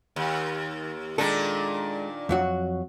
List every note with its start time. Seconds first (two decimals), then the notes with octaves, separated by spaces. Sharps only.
0.16 D#2
1.18 A#2 D#3 G#3 D4 A4
2.29 F2 F#3 F#4